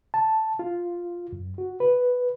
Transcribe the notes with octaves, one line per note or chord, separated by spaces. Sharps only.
A5
F4
F#2
F#4
B4